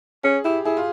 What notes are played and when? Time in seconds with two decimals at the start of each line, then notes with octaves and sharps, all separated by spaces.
0.24 C#4 G#4
0.45 E4 G4
0.65 E4 G#4
0.77 F4